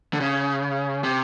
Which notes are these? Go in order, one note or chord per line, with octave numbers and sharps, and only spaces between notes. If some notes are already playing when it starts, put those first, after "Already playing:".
D3
C#3
C3